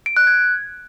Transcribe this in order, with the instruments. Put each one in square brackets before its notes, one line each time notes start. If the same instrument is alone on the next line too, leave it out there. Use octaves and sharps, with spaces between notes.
[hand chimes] D7
F#6
G#6